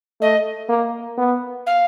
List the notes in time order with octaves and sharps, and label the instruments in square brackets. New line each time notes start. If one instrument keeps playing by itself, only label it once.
[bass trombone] A3 [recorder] D#5
[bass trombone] A#3
B3
[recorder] F5